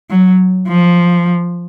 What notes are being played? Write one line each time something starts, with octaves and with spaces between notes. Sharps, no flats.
F#3
F3